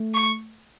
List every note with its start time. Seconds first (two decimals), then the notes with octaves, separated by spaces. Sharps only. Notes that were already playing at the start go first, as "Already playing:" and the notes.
Already playing: A3
0.14 C#6